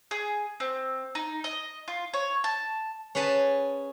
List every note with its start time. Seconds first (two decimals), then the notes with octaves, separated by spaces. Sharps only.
0.11 G#4
0.60 C4
1.15 D#4
1.44 D#5
1.88 F4
2.14 C#5
2.44 A5
3.15 C#4 G#4 B4 A5